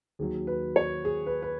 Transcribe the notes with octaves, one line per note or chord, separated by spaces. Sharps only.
D#2 D#3 F#3 G#4
B4
C#5
G#4
B4
B4